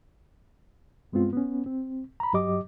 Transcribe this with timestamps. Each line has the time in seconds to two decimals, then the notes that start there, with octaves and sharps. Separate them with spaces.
1.13 G2 G#3 B3 C4 F4
1.33 B3 C#4
1.66 C4
2.20 A#5 B5
2.33 G2 F#3 G4 D#5 D6